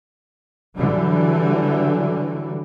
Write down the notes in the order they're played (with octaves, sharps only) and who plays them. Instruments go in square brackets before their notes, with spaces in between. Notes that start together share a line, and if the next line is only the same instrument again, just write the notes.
[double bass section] D3 E3 F#3 G3